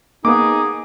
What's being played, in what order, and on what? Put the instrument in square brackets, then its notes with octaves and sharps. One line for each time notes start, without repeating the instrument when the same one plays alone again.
[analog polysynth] A#3 B3 [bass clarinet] D#4 [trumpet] G#4 [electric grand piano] D6